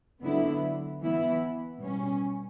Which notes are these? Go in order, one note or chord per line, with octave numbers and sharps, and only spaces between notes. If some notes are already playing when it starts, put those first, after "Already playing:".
D3 F#3 B3 E4
E3 B3 E4
B2 G3 C#4